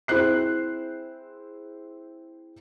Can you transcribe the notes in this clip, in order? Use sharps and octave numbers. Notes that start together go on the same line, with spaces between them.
C4 E4 G#4 C5 F#6 C7